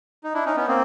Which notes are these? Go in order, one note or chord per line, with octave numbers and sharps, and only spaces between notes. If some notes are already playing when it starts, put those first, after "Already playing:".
D#4
D4 E4
C#4 D#4
B3 C#4
A#3 C4